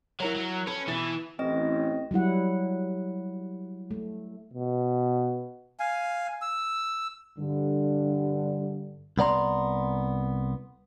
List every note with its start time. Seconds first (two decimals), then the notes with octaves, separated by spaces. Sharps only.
0.20 F#3 E4 A#4 C#5
0.35 F#3
0.67 C#4 A4 B4
0.87 B2 E3 E4 A6
1.39 A1 C4 D#5
2.11 F#3 G3 E4 F#5
3.91 A3
4.53 B2
5.79 F5 G#5
6.42 E6
7.39 G2 D3
9.18 C2 B3 D5 A#5 C6